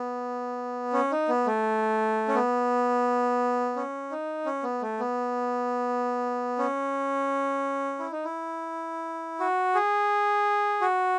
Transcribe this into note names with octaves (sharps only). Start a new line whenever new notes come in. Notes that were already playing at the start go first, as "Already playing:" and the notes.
Already playing: B3
C#4
D#4
B3
A3
C#4
B3
C#4
D#4
C#4
B3
A3
B3
C#4
E4
D#4
E4
F#4
G#4
F#4